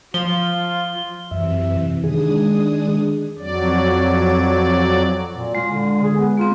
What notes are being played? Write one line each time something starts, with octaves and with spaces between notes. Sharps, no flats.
F3 F4 G7
F#2 C3 E3 E5
D#3 G#3 D4 G#4 D#6
F2 F#3 D5
A#2
G#3 F4
D3
G#4
B3
A#3 C4 F4